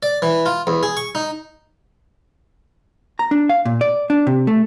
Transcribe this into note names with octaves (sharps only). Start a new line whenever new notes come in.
D5
E3
F4
E2
G#4
C#6
D#4
A#5
D4
F5
A#2
D5
D4
C3
A3